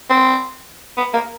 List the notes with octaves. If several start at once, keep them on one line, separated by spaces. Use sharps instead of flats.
C4
B3
A#3